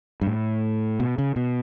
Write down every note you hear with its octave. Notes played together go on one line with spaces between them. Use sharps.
G2
A2
B2
C#3
B2